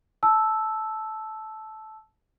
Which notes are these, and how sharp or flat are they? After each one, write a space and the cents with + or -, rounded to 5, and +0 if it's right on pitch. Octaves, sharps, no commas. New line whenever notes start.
A5 -10 E6 +0